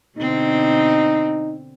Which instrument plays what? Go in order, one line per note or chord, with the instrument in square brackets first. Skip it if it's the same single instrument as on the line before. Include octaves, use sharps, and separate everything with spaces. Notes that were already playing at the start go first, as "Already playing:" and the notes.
[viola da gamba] B2 D3 C4 [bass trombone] D#4